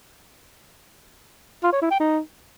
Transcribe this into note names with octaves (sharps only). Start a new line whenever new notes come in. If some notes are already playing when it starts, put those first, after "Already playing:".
F4
C#5
E4
G5
D#4